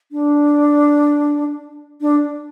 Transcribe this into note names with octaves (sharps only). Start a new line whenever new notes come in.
D4
D4